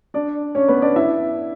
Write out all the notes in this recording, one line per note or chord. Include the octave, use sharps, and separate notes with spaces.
D4 D5
C#4 C#5
B3 B4
D4 D5
E4 E5